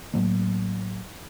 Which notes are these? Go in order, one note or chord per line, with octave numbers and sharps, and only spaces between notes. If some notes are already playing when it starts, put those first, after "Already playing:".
A2 F#3 A3 A#3